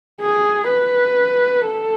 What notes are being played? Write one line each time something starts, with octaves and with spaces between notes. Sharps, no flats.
G#4
B4
A4